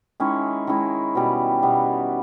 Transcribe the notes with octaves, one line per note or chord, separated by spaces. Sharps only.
D#3 G#3 C#4 E4
D#3 G#3 C#4 E4
B2 G3 B3
B2 G3 B3